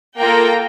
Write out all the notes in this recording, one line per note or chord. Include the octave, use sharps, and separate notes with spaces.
A#3 F4 A4 G5 A#5